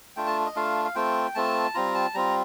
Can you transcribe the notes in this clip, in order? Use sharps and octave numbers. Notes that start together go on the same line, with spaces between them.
A3 D4 F4 G5
A5
D#5
A3 D4 F4 F5
F5
A3 C4 F4 G5
A3 C4 F4 A5
G3 C4 F4 A#5
A5
G3 C4 F4 A#5